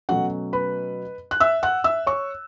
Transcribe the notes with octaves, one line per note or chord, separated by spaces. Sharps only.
B2 F#3 A3 C#4 F#4 F#5
B4 B5
F#6
E5 E6
F#5 F#6
E5 E6
C#5 C#6